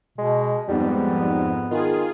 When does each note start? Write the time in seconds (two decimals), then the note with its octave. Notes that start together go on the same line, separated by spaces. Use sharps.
0.18 B2 G#3
0.68 F2 G#2 G3 B3
1.71 D#3 F4 G#4